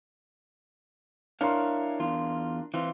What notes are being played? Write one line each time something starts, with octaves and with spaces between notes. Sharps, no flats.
D4 E4 A#4 C#5 F5 C6
E2 F4
E3 C4 F4